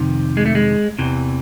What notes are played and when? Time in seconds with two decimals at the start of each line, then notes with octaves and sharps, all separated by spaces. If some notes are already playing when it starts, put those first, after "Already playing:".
Already playing: F2 C3 D#3
0.37 G#3
0.46 A3
0.55 G#3
0.99 E2 C3 E3